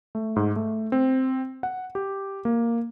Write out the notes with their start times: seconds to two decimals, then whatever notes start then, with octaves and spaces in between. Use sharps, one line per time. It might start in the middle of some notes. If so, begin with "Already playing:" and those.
0.15 A3
0.36 G#2
0.56 A3
0.92 C4
1.63 F#5
1.95 G4
2.45 A#3